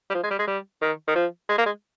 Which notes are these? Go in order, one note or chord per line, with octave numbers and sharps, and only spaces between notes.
G3
F3
G#3
G3
G#3
G3
D#3
D#3
F3
G#3
A#3
G#3